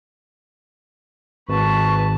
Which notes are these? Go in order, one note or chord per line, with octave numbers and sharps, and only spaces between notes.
G#1 B4 A5 C#6